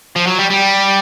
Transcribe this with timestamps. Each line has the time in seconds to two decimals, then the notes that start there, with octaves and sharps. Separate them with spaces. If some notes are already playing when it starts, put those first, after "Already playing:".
0.16 F3
0.27 F#3
0.39 G3
0.50 G3